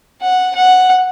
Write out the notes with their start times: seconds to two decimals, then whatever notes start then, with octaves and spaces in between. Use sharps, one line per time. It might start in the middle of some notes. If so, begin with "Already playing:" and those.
0.21 F#5
0.55 F#5